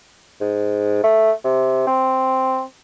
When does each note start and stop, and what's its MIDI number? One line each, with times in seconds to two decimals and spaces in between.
0.41 1.03 44
1.04 1.32 57
1.44 1.84 48
1.87 2.62 60